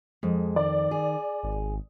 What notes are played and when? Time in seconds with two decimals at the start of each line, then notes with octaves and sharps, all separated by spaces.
0.23 F2 G#3
0.56 D#3 D5
0.91 G#4
1.43 G#1